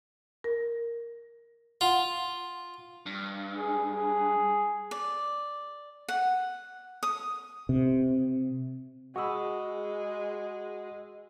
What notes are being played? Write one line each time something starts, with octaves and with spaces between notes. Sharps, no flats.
A#4
F4 F#5
G2
G#4
G#4
D5
F#5
D#6
C3
G#3 F#4 G#4 F#5 B5 D#6 E6